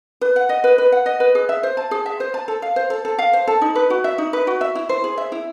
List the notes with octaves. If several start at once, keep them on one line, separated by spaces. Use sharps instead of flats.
B4
F#5
D#5
B4
B4
F#5
D#5
B4
G#4
E5
C5
A5
G#4
E5
C5
A5
A4
F5
C5
A4
A4
F5
C5
A4
D#4
B4
F#4
E5
D#4
B4
F#4
E5
E4
C5
G#4
E5
E4